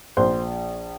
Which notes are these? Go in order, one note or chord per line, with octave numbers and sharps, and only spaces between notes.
A#1 C5